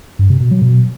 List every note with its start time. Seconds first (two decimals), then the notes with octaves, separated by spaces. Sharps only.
0.19 G2
0.30 C3
0.40 B2
0.51 F#3
0.62 B2